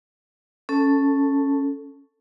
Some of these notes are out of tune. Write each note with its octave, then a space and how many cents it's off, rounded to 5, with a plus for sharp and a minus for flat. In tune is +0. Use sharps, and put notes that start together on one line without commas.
C#4 +0 A4 +5 A5 +0